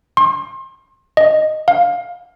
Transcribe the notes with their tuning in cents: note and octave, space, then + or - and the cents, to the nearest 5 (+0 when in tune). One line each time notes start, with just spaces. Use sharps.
C6 +35
D#5 -5
F5 +20